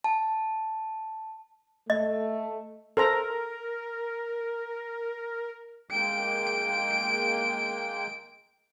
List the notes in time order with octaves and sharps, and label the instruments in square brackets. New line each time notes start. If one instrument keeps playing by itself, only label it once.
[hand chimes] A5
[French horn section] A3 [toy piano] D#5
[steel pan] A4 C5 A#5 [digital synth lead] A#4
[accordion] G#3 A#3 G5 [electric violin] D7